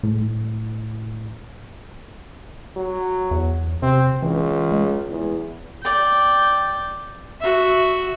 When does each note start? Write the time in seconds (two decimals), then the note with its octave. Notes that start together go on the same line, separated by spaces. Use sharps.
0.03 A2
2.76 F#3
3.31 E2
3.82 C3 C4
4.23 C#2 E3
4.72 G#3
5.10 E2
5.82 D5 G5
7.40 F#4 E5